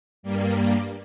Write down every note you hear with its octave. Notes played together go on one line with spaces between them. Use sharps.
G2 G3 A#3